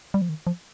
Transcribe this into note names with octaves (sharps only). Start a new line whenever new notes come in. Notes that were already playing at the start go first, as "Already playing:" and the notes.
G3
F3
D#3
F3